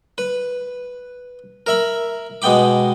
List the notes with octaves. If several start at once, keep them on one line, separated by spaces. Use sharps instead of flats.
B4
A#4 E5 B5
B2 G#3 B3 G5 B5 D6